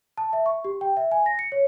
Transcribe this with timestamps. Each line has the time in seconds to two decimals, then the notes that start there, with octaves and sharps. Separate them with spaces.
0.17 A5
0.33 E5
0.46 C#6
0.65 G4
0.81 G5
0.97 E5
1.12 G#5
1.26 A#6
1.39 C#7
1.52 C#5